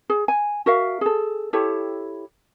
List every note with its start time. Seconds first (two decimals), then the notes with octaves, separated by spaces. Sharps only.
0.10 G#4
0.28 G#5
0.66 F#4 A#4 E5 F5
1.01 G#4 A4
1.53 E4 G4 A4 C#5